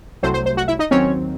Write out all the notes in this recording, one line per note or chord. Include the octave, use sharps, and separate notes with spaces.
C2 C3 F#3 A3 C5
C5
C5
F#4 F#5
E4 E5
D#4 D#5
D#2 D#3 F#3 C4 C#4 C#5